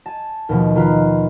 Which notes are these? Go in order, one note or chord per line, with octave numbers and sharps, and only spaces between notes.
G#5 A5
D#2 B2 F3
D#3 F4 B4